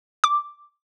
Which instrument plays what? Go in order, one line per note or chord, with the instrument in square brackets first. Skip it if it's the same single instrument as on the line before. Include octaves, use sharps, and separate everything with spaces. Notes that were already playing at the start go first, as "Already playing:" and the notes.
[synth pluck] D6